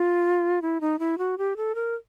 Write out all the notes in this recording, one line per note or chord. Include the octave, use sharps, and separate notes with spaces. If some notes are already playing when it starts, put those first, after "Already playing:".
Already playing: F4
E4
D#4
E4
F#4
G4
A4
A#4